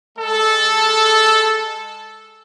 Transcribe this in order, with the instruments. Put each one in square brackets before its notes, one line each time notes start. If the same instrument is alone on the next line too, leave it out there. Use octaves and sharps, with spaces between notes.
[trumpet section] G#3 A4